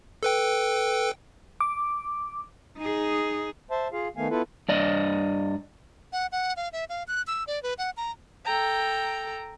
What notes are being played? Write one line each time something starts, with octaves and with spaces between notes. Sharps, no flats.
A4 B4 G5
D6
D#4 G#4
C5 E5 A5
F4 G#4 F5
D#3 A3 B3 F5 G#5
B3 E4 F4 A4 B4
G2 D5 D#5
F#5
F#5
F5
E5
F5
F#6
E6
D5
B4
F#5
A#5
A4 G5 A#5